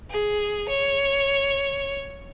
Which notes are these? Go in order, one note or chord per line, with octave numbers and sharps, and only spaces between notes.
G#4
C#5